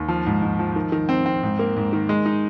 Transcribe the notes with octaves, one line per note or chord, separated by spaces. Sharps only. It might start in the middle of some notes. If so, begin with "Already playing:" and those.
Already playing: D#2
F3
G#2
G#2
F3
D#3
D#3
C4
C4
G#2
A#3
G#2
D#3
G#3
D#4